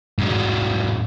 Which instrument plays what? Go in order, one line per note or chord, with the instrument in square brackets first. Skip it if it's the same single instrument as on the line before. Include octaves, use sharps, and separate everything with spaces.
[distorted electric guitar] G#2 F#3